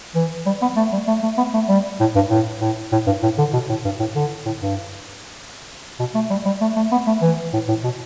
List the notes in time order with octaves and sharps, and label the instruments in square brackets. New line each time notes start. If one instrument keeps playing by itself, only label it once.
[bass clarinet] E3
G3
B3
A3
G3
A3
A3
B3
A3
G3
A2
G2
A2
A2
A2
G2
A2
D3
B2
A2
G2
A2
D3
A2
G2
B2
A3
G3
G3
A3
A3
B3
A3
E3
A2
A2
B2